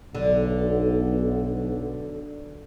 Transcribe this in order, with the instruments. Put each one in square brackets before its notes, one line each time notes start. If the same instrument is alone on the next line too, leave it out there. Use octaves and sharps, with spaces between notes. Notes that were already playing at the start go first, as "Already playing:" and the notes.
[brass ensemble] B1 [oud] D3